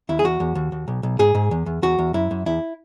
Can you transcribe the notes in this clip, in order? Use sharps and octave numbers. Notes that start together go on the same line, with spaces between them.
D#2 E4
G#4
E2 F#4
E2
D#2
D#2
B1
B1
G#2 G#4
G#2
E2
E2
E2 F#4
E2
F#2 E4
F#2
E2 E4